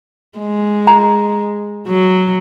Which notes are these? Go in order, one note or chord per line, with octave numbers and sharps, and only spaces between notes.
G#3
A#5
F#3